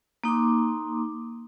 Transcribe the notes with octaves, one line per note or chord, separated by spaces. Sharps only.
A#3 D#4 C6 D6